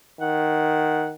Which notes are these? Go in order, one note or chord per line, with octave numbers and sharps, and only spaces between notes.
D#3 F#5